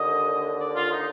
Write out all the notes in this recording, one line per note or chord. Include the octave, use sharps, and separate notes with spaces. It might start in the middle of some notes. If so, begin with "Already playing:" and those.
Already playing: D#2 D3 D#5
D5
F4
D#4